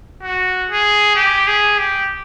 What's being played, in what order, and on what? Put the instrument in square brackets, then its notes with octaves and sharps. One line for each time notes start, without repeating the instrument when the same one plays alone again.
[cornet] F#4
G#4
G4
G#4
G4